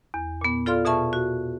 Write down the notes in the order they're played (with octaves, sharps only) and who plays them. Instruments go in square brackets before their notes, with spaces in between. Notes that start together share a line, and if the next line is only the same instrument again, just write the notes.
[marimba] E2
A#2 B3
F4 A4 D5 F5 C6 F6
B2 G#4 E5 A5 C#6
F#4